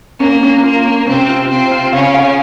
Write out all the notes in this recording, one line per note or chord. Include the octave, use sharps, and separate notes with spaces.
A#3 C#4
C#4
A#3 F4
C#4
C3 C4 C#4
F4
C3 C4 F4
F4
C#3 C#4 F5
F5